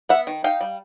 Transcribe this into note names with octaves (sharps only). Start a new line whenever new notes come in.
B3 E5 F#5
D#3
D#4 F5 G5
G3